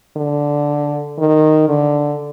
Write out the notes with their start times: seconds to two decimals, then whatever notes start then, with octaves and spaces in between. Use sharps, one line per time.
0.17 D3
1.18 D#3
1.69 D3